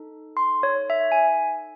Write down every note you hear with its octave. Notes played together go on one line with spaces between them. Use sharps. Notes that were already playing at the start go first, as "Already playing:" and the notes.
Already playing: D#4 A4
C6
C#5
E5
G#5